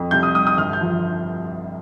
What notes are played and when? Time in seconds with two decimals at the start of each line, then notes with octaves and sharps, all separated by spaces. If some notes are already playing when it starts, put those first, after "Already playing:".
Already playing: F2
0.11 C2 G6
0.23 D#6
0.35 G3 D#6
0.47 D#6
0.58 G1 F6
0.73 G6
0.81 F3